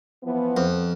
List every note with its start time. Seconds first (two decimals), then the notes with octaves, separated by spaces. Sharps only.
0.23 E3 F3 B3
0.57 F2